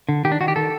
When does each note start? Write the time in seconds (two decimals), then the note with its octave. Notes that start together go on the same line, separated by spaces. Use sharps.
0.09 D3
0.25 D#3 G4
0.32 D4
0.41 D#3 F#4
0.48 G4
0.56 D#3 A4